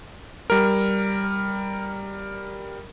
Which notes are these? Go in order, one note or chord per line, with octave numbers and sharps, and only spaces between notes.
G3 A#4